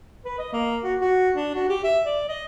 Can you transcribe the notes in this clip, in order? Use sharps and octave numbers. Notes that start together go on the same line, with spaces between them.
B4
D#5
A#3
F#4
F#4
D4
F#4
G4
E5
D5
D#5